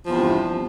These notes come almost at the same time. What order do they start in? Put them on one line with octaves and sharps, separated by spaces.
F3 E2 C3 G2